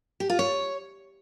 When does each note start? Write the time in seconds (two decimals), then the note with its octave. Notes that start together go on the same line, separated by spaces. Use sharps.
0.20 G4
0.30 F4
0.39 C#5